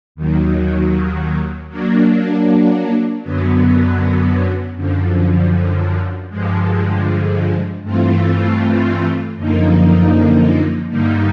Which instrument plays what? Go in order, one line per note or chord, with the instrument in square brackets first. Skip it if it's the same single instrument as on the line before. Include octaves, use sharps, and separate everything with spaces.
[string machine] D#2 D#3 F#3
F#3 A#3 D4
F#2 D3 F#3 B3
F#2 D3 F3
G2 D3 F3 G#3
G2 E3 A3 C4 F4
F#2 D3 F3 A#3 D#4
G2 D3 G3 A#3 D#4